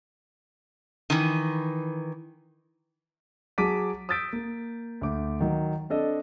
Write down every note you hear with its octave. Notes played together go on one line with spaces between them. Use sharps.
D#3 E3
F#3 G#4 A5 D6 B6 D#7
D#6 E6 G6 A6 B6 D7
A#3
D2 D6
D#3 F#3
C4 D4 A4 D#5